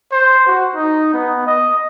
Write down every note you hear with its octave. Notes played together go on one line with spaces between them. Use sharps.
C5
F#4
D#4
B3
D#5